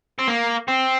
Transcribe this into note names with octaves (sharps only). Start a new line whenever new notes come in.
C4
A#3
C4